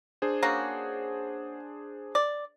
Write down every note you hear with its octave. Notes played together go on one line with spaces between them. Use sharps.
D4 G#4 C5
A#3 C#4 F#4
D5